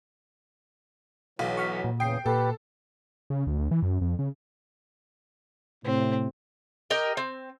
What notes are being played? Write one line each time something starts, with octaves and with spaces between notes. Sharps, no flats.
B1 E3 F#3 F5
C#6 F6 B6
A#2
E2 C#3 G5 D#6 C7
A#2 G4 A4 B4
C#3
D2
D2
E3
F#2
F2
C#3
A2 C3 C4
G4 A#4 D#5
C4